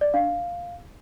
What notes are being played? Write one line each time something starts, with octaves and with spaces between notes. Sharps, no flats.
D5
D4 F5